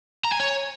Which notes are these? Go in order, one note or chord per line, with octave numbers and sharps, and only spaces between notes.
A#5
G#5
C#5